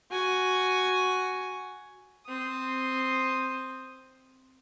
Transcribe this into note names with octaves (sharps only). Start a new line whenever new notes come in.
F#4 G#5
C4 D#6